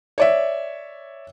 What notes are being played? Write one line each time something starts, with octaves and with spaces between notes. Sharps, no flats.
C#5 D5 E5